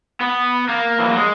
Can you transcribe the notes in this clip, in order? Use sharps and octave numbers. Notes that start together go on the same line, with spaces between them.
B3
A#3
E3
F#3
G#3